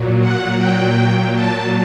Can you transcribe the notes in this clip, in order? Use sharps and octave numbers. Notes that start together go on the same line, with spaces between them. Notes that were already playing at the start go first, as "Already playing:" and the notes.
Already playing: A#2 F#3
F#5
G5
A5